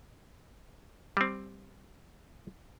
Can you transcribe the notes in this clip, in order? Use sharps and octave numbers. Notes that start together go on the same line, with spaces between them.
G3 C4